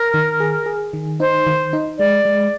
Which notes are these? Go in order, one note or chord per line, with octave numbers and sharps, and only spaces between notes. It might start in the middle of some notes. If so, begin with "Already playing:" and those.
Already playing: A#4
D#3
G#4
G#4
D#3
D#4 C5
D#3
D#4
G#3 D5
G#3